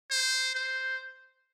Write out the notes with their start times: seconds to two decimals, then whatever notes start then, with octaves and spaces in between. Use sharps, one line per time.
0.11 C5
0.55 C5